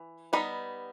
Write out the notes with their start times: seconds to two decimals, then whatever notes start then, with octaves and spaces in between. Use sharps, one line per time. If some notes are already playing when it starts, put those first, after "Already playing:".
Already playing: E3
0.33 G3 B3 D#4 B5